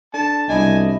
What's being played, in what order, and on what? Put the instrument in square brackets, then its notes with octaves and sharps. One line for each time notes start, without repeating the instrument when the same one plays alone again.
[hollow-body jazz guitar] D4 A4 [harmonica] A5
[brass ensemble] C2 [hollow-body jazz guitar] B2 D4 E4 [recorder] D#5 [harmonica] G#5